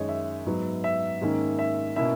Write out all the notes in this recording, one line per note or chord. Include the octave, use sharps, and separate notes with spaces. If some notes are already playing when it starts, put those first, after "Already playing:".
Already playing: F#2 D#3 G#3 D#4 C#5
E5
G#2 F#3 B3
E5
G#2 D#3 A#3 C#4
E5
B2 A#3 C#4 E4 E5